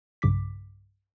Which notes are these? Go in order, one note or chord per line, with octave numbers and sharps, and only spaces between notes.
B1 G2 C#3 D6 B6